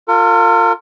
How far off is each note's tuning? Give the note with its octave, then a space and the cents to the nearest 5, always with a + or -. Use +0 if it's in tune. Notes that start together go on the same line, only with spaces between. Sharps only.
F4 +10 A#4 -45